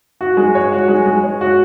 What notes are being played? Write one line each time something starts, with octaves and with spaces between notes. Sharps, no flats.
F#4
G#3
C#5
F#4
G#3
G#3
C#5
F#4